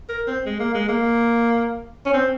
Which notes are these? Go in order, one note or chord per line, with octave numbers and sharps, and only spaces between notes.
A#4
C4
G#3
A#3
G#3
A#3
C#4
C4